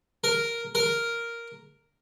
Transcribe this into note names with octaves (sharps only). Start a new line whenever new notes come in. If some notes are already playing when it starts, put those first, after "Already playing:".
A#4
A#4